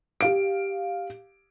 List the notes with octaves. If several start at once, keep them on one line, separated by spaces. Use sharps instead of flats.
G4 F5 D7